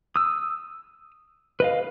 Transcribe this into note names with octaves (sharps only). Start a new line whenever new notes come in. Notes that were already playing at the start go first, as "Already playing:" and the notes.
D#6 E6
B4 D#5 F5